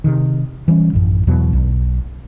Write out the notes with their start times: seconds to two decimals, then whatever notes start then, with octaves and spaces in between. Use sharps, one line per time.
0.04 C3 D#3
0.68 E3 G3 A#3 C#4
0.93 A1 F#2
1.27 E1 E2 B2 F#3
1.53 B1